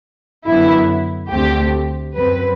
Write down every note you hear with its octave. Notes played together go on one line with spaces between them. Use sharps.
F#2 D3 F#3 B3 E4
D2 D3 A3 C4 G4
F#2 F#3 C4 B4